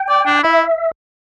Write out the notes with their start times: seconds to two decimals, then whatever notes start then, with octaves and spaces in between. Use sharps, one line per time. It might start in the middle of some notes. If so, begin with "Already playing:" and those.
Already playing: G5
0.09 D5
0.26 D4
0.44 E4 E5